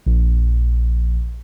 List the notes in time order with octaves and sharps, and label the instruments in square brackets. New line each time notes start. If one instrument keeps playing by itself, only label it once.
[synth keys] A#1